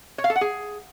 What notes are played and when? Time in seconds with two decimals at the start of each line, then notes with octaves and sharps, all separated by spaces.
0.18 C#5
0.24 F5
0.30 A4
0.36 F#5
0.41 G#4